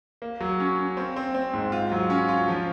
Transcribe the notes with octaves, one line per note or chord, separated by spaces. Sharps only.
A#3
F#3
C#4
C#4
C4
C4
C4
G#2
F4
F#3
C#4
F4
F3